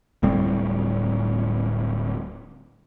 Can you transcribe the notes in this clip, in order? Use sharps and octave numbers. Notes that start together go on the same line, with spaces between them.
D1 A2 G3 C4